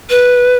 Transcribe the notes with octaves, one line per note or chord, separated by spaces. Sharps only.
B4